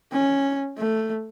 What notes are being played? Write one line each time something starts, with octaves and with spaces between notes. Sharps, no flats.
C#4
A3